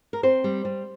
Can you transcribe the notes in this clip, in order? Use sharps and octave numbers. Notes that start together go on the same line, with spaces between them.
A#4
C4 C5
G3
G3